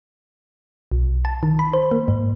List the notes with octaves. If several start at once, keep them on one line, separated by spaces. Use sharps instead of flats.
B1
A5
D#3
B5
C5
A#3
G#2